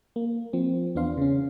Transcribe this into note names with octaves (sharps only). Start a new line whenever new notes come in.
A#3
F3 C4
E2 B3 D4 F5 C6
C#3 C#4